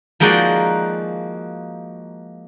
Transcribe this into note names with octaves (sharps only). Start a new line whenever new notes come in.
F3 G#3 A#3 D#4 F#4 D5